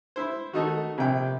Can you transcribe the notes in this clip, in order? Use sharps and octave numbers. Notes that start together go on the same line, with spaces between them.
E4 C5
D#3 A3 D#4 F#4
A#1 C3 G5